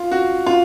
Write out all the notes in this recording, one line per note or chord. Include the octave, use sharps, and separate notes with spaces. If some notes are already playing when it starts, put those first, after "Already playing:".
Already playing: F4
F#4
F4